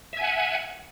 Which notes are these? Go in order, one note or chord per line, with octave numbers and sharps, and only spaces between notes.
E5 F#5 G#5